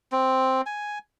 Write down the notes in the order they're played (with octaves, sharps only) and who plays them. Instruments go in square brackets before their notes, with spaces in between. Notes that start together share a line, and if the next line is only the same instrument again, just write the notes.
[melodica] C4
G#5